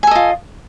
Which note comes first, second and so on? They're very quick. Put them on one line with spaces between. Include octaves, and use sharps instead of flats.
G#5 A4 D#5 F4